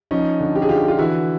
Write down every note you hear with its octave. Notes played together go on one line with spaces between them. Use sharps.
F3 C#4 D#4
D3
G4
G#4
D3 F4 G4
F4
E3 E4 F#4